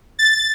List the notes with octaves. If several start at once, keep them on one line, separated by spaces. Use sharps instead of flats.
A6